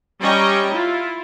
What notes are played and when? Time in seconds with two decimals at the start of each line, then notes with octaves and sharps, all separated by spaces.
0.22 G3 C#4 D#5 G5 A#5 C#6
0.75 E4 F4